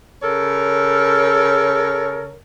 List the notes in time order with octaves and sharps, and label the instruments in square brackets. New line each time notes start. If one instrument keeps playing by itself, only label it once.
[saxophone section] C#3 A4 A#4 C#5